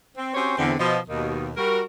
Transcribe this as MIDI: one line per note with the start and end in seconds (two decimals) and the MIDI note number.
0.17 0.33 60
0.35 0.53 60
0.35 0.53 61
0.35 0.53 66
0.35 0.53 67
0.35 0.53 72
0.35 0.53 73
0.58 0.74 40
0.58 0.74 50
0.58 0.74 60
0.79 0.98 47
0.79 0.98 53
0.79 0.98 75
1.09 1.50 39
1.09 1.50 47
1.09 1.50 51
1.57 1.82 55
1.57 1.82 66
1.57 1.82 70